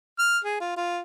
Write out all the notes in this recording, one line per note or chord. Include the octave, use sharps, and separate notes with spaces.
F6
G#4
F4
F4